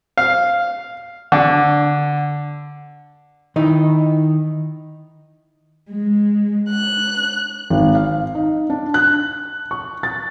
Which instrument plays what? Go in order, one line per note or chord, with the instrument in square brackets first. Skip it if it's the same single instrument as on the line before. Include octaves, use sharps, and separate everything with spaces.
[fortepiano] F5
D3
[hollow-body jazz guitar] D#3 D#4 E4
[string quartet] G#3
F#6
[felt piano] G#1
F5
D#4
D4
F#6
C#6
A6